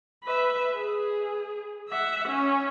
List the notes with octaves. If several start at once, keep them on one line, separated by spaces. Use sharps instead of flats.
B4 E5
G#4
E5 F#5
C#4